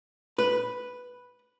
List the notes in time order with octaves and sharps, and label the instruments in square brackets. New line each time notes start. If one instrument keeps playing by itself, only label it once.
[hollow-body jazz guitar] B4